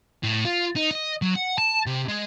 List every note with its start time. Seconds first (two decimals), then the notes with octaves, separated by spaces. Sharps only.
0.23 A2
0.45 F4
0.76 D#4
0.91 D#5
1.22 F#3
1.35 F#5
1.58 A5
1.86 C3
2.08 G#3